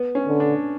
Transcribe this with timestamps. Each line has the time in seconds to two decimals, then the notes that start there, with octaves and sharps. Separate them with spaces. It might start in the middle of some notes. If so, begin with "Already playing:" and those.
Already playing: B3
0.15 C#4
0.28 D3
0.40 D4